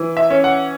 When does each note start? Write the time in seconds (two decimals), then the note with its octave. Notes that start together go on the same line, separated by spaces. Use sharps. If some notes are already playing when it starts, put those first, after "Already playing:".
Already playing: E3
0.17 E5
0.30 C#4
0.44 F#5